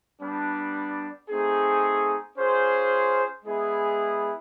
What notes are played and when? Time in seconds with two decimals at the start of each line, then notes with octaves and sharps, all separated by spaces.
0.21 G3 B3 D4
1.29 A3 C4 D#4 G#4
2.38 C#4 F4 G#4 C5
3.45 G#3 B3 E4 G#4